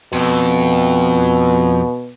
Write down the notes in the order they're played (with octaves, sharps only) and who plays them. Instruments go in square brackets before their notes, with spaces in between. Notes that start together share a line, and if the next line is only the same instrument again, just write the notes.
[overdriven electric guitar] F2 [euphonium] B2